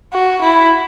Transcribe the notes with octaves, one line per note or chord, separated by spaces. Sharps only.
F#4
E4